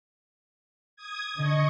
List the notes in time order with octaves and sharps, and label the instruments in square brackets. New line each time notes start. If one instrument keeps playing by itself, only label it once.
[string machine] D#6 G#6
[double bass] D3 [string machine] D#5 C#6